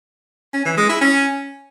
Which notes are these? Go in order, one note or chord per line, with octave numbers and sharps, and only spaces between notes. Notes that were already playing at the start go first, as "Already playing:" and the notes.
C#4
E3
G#3
E4
C#4